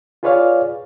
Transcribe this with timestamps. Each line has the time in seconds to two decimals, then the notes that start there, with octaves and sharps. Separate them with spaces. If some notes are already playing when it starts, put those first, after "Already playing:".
0.23 F4 G#4 B4 C#5 D5 F5